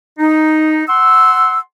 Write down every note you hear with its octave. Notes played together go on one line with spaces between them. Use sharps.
D#4
F#5 C6 E6